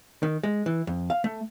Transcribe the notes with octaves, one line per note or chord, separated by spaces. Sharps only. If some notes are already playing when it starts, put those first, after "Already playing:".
D#3
G#3
E3
F2
F5
A3